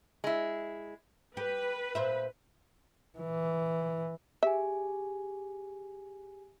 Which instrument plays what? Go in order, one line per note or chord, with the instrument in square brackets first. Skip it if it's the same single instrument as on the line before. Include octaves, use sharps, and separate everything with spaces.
[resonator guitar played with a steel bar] G#3 E4
[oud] G4 [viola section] B4
[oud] A#2 C5 E5
[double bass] E3
[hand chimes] G4 G#4 G#5 [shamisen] E5